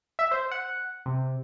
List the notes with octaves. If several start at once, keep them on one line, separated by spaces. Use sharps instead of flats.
E5
C5
F#5
C3